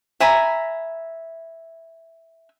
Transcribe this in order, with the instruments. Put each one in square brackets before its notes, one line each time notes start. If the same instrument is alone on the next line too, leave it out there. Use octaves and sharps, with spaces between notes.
[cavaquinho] E5 G#5 A#5 B5